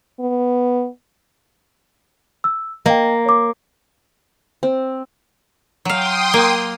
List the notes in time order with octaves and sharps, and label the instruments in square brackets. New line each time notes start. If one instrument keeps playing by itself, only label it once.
[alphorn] B3
[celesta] E6
[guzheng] A#3 [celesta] D#5 F5 G5
[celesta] C#5 D6
[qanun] C4
[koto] F#3 F5 [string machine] G5 C6 D#6
[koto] A#3